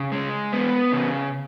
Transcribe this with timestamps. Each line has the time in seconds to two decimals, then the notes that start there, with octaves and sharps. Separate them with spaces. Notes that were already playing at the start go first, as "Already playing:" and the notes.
Already playing: C#3
0.12 G#3
0.52 B3
0.92 C#3